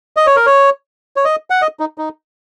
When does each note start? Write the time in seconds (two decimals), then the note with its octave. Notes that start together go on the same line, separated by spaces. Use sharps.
0.17 D#5
0.26 C#5
0.36 A#4
0.46 C#5
1.16 C#5
1.25 D#5
1.50 F#5
1.62 D#5
1.80 D#4
1.98 D#4